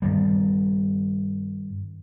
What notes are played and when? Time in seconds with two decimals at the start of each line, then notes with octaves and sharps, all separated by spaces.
0.02 G2 D#3 G3